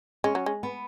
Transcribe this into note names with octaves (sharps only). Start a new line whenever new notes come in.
G#3 C#4
F#3
G#3
B3